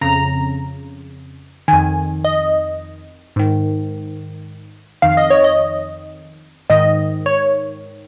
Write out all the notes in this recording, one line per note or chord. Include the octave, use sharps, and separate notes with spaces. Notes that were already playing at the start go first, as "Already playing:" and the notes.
F2 C#3 A#5
F2 D#3 G#5
D#5
G#2 D#3
F2 D#3 F5
D#5
C#5
D#5
G#2 D#3 D#5
C#5